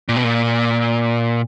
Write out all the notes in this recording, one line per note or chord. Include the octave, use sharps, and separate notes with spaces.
A#2
B2
A#2